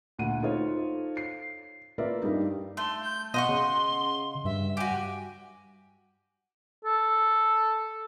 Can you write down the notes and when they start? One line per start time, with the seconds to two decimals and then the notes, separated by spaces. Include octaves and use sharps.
0.18 D2 A#2 F#5 D#7
0.42 D#4 F4 A4 C5 C#5
1.17 C7
1.98 A#3 F4 A#4 B4 D5 E5
2.22 G2 G3 D#4
2.77 A3 C6
3.02 G6
3.34 B2 D#5 F#5 C6 C#6
3.49 C#3
4.45 G2 E5
4.77 F#4 G4 G#5
6.85 A4